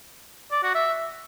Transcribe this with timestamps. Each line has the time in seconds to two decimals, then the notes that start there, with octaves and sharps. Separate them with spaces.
0.52 D5
0.63 F#4
0.75 E5